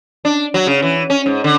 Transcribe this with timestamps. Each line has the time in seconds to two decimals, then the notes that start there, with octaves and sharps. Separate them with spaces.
0.25 D4
0.54 F#3
0.67 C#3
0.82 E3
1.10 C#4
1.26 G#2
1.44 D3